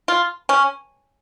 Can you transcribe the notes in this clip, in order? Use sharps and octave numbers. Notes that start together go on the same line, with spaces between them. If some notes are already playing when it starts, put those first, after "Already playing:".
F4
C#4